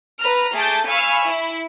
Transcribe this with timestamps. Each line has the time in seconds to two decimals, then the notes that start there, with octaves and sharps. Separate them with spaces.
0.21 B4 A#5 F6
0.56 A3 G#4 A5 D6 G6
0.87 F5 G#5 B5 C#6 E6 F6
1.27 E4